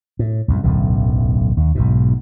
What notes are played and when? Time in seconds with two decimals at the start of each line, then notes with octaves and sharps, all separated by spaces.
0.19 A2
0.48 C2 F#2 A2
0.63 D1 B1 F#2 D3
1.57 D#2
1.75 B1 G#2 B2